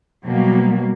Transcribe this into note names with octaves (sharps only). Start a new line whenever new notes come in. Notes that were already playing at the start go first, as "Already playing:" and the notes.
B2 F#3 G3 A#3